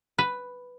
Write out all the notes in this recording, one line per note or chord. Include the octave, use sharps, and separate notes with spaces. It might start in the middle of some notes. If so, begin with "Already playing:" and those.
B4